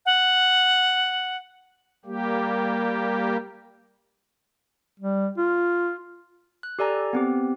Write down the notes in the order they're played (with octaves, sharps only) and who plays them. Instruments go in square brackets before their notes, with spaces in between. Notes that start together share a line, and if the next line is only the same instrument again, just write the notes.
[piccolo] F#5
[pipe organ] G3 A#3 G4
[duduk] G3
F4
[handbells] F#6
G4 A4 D5 G#5 A#5
B3 C4 G4